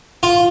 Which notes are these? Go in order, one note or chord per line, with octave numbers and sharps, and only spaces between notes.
F4